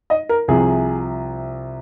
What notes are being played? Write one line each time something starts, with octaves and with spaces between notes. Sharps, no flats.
D#5
A#4
C2 C3 F3 G#4